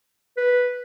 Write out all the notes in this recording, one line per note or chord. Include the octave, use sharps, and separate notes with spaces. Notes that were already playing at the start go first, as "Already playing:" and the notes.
B4